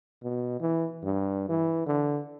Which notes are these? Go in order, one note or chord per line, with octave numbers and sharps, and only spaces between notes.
B2
E3
G2
E3
D3